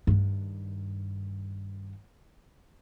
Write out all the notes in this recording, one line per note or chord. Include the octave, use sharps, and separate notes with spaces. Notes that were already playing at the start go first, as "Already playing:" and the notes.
G2 D#3